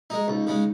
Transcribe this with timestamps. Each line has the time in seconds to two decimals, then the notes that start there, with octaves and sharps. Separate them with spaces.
0.10 G#3 D#4
0.28 C#2 D#4
0.47 C#3 G#3